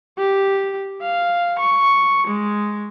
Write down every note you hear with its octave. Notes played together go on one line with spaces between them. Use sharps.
G4
F5
C#6
G#3